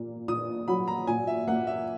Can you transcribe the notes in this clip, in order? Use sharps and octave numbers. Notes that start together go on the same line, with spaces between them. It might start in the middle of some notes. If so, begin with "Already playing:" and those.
Already playing: A#2 A#3
A#2 D#6
F#3 B5
A#5
A#2 G#5
E5
A#3 F#5
E5